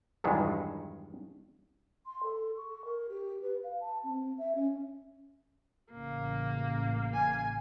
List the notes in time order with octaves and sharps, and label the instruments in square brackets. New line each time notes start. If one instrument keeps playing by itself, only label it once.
[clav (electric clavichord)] B1 E2 G2 D#3 G#3
[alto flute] C6
A4
C#6
A#4
G4
B4
F5
A5
C4
E5
C#4
[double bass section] A1 C#3 [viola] A#3
[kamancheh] G#5